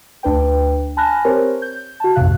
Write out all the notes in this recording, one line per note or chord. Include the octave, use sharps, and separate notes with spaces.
D2 D4 B4 G5
G#5 A5 B5 F6 F#6 A#6
C4 G4 A#4 C5 C#5
G6
F#4 A5
A#1 F2 G#2 C3 F5 F#6